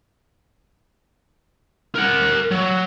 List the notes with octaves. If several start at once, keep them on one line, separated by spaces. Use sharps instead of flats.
A#4 F#5
F#3